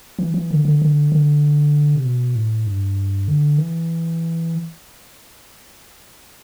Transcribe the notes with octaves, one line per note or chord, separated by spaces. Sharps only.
E3
E3
D3
D3
D3
D3
C3
B2
A2
G2
D3
E3